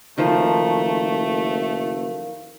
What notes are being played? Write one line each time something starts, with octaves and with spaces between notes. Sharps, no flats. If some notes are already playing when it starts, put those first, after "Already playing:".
F#1 D#3 F3 A3 D#4 A#4 C5 F5